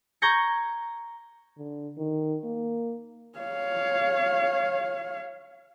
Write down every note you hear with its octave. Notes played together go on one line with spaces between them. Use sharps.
A#5 C#6 G6 G#6 A#6 C#7
D3
D#3
A#3
C#5 F5